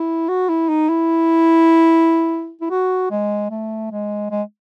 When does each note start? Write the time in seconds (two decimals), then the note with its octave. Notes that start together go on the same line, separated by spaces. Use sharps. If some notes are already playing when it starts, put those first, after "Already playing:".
Already playing: E4
0.29 F#4
0.49 E4
0.69 D#4
0.89 E4
2.61 E4
2.70 F#4
3.11 G#3
3.50 A3
3.91 G#3
4.31 G#3